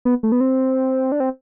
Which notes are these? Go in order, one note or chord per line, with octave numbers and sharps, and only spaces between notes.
B3
A3
B3
C4
D4
C4